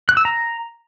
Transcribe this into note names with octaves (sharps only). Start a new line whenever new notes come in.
F#6
E6
A#5